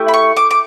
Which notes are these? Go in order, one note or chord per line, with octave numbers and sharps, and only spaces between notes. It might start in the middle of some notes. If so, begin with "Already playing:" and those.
Already playing: A3 E4 G4
B5
C#6
D6
D6